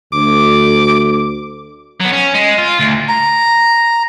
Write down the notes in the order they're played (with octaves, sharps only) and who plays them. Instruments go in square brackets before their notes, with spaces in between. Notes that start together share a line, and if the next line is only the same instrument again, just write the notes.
[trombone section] D2 [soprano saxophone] D6
[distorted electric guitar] F#3 B3
C#4
G#3
F4
D2
[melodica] A#5